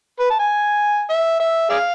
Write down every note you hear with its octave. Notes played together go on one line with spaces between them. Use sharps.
B4
A5
G#5
E5
E5
G#4 D5 F5